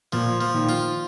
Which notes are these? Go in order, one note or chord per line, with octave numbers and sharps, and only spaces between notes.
A#2 F3
F3
A#2 D#3
F4